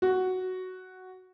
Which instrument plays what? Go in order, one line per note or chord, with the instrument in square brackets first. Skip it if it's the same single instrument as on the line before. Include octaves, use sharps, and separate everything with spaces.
[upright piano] F#4